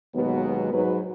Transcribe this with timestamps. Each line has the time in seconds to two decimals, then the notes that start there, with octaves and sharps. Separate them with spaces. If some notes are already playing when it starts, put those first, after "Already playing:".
0.15 D#2 B2 F#3 G#3 B3
0.72 G#2 F#3 B4